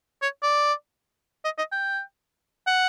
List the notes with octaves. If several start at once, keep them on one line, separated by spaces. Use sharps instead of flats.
C#5
D5
D#5
D#5
G5
F#5